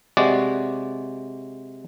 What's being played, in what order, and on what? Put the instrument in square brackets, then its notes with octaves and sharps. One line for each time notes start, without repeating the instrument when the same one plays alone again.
[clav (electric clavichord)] C3 G#3 F#4 D5